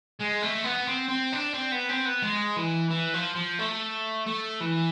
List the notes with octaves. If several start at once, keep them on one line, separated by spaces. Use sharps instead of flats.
G#3
A3
B3
C4
C4
D4
C4
B3
C4
B3
G#3
E3
E3
F3
F3
A3
A3
E3